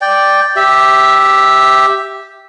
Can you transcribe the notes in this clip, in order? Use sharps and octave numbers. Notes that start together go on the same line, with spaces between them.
D5 G5
G4 E5